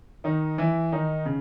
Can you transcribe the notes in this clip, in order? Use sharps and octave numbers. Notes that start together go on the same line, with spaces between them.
D#3 D#4
E3 E4
D#3 D#4
C#3